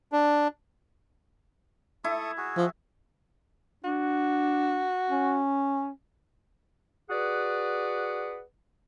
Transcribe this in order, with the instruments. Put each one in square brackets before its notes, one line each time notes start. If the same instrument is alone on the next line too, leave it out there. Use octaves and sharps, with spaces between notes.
[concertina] D4
[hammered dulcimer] E4 [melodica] A4 C#6 D#6
[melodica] F#4 G#4
[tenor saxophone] F3
[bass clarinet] D4 [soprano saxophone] F#4
[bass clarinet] C#4
[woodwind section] F#4 G#4 B4 D5 F#5